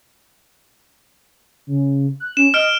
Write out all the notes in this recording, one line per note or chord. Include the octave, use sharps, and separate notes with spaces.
C#3
F#6
C#4 E7
D#5 F6 D7